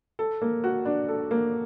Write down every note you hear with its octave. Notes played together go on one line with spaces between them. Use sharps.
A4
A#3
F#4
D4
A4
A#3